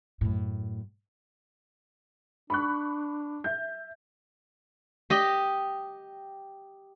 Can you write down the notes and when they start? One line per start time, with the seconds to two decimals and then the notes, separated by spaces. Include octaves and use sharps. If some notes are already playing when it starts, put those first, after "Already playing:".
0.21 F#2 A2
2.50 D4 B5 C#6 F#6
3.44 E5 G6
5.10 G4 D#5